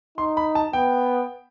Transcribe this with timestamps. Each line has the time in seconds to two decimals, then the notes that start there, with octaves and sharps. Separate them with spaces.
0.18 D#4 C6
0.37 B5
0.55 A5
0.73 B3 G5